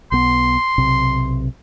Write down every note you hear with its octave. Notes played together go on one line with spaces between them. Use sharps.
B1 B3 C6
B1 C3